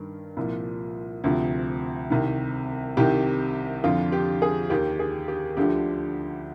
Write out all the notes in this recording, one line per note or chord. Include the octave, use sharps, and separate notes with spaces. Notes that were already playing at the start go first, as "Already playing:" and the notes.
Already playing: G2 D#3 A#4
C2 A#2 F3
D2 C3 F3
C2 C3 D#3
C2 C3 D#3 G4
F2 D3 F3 F4
G4
G#4
D#2 D#3 G4
G#4
G4
D2 D3 F3 G4